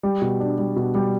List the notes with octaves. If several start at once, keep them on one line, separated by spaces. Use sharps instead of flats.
G3
B2
D4
G3
B2
G3